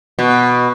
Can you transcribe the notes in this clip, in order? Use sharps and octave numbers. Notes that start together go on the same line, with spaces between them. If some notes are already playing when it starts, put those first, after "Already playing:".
B2